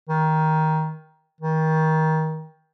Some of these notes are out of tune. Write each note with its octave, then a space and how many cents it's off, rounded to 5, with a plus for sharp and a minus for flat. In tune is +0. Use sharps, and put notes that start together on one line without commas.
D#3 +15
D#3 +25